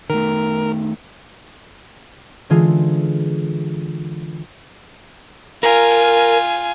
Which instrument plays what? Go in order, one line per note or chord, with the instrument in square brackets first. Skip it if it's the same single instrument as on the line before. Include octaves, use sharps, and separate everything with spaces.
[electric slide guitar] D#3 A3 [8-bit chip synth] A#4
[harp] D3 E3 G#3 F4 G#4
[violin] F4 G#5 [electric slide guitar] A#4